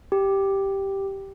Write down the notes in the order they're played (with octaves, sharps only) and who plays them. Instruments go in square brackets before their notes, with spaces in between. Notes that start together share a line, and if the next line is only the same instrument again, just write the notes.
[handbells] G4